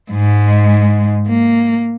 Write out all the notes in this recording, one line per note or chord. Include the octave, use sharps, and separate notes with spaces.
G#2 G#3
A#3